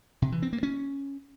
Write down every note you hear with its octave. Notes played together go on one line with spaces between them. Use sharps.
C3
E3
C4
A#3
C#4